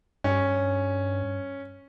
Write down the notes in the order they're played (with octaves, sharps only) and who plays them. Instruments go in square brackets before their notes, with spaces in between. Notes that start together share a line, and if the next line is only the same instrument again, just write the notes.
[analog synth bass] G2 [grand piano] C#4